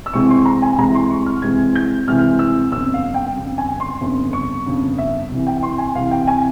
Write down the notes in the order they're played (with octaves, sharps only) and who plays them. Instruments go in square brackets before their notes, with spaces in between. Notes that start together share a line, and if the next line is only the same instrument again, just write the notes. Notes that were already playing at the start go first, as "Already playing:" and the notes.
[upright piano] E6
C2 C3 E3 G#3 C4 C#6
C6
A#5
G#5
C2 C3 E3 G#3 C4 A#5
C6
C#6
F6
C2 C3 E3 G#3 C4 G#6
G6
C2 C3 E3 G#3 C4 F6
E6
G1 F2 C#3 E6
F5
G5
G1 F2 C#3
G#5
C6
G1 F2 C#3
C#6
G1 F2 C#3
E5
C2 C3 E3
G5
C6
G#5
C2 C3 E3 F5
G5
G#5